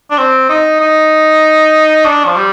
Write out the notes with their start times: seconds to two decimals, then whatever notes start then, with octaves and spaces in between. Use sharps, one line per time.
0.11 D4
0.18 C4
0.49 D#4
0.81 D#4
2.05 D4
2.26 F3
2.36 G3